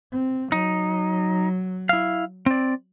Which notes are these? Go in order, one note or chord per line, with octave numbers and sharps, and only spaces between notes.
C4
F#3 D#4
E4 F5
C4 D5